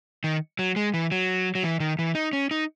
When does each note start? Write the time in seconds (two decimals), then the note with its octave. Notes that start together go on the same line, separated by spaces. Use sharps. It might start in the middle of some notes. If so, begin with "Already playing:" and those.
0.24 D#3
0.59 F#3
0.76 G#3
0.94 E3
1.12 F#3
1.55 F#3
1.63 E3
1.80 D#3
1.99 E3
2.15 D#4
2.33 C#4
2.51 D#4